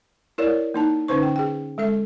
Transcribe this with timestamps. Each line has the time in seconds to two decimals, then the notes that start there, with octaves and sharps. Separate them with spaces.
0.38 E4 A#4 C#5 D5
0.74 A#3 D#4 A5
1.08 D3 C#4 D#4 B4 C5 C#6
1.23 G5
1.36 G#4 G5
1.78 G#3 A4 E5